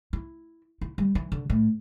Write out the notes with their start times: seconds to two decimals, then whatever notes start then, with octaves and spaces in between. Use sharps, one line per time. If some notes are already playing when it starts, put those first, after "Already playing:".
0.13 E4
0.81 E4
0.98 G3
1.15 E3
1.32 D3
1.50 A2